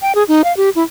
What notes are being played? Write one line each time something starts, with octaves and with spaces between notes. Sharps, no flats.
G5
G#4
D#4
F5
G4
E4